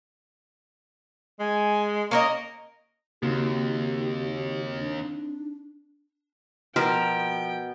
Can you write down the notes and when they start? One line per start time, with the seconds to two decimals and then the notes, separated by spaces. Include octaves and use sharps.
1.40 G#3 G#5
2.11 A#3 C#4 A#4 D#5 A#5
3.23 D#2 C#3 A#3 C4 D#4 F#4 G4
4.79 D4
6.76 B2 F3 A#4 G5